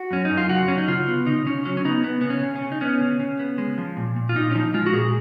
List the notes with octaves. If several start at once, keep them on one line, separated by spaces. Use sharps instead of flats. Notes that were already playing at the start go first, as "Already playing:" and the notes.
Already playing: F#4
F#2 C#4
D#4
F#2
F4
C#3 F#4
F#3 C#4
D#4
C#3 F4
B3
C#3 D#4
C#3 C#4
F#3 C#4
C#4
B3 D#4
C#3 B3
C#3 B3
C#4
C#3
C#4
C#3
D#4
B3 C#4
C#3
C#3
B3
G#3
F3
A#2
A#2
F4
A#2 D#4
C#4
F3 D#4
G#3 F4
F#4
A#2 G#4